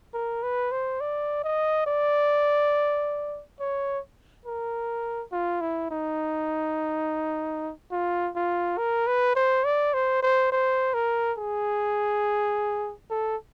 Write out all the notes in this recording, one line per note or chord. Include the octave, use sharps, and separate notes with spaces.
A#4
B4
C5
D5
D#5
D5
C#5
A#4
F4
E4
D#4
F4
F4
A#4
B4
C5
D5
C5
C5
C5
A#4
G#4
A4